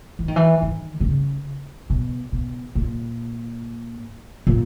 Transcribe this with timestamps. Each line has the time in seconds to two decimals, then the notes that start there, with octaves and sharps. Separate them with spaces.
0.19 E3
0.28 D#3
0.36 E3
0.62 D#3
1.00 B2
1.05 C#3
1.90 B2
2.32 B2
2.75 A#2
4.47 A#2